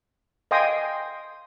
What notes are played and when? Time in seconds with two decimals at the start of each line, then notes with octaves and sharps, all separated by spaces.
0.51 D#5 F5 G5 G#5 C6 D#6